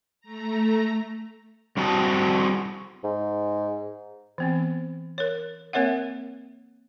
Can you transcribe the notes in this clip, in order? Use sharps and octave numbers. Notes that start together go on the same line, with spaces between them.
A3 A#5
G3 C4 F#4 G#4 G#5 A5
G#2
E3 B3 C4
A#4 C#5
A#3 C4 A#4 C#5 E5 F#5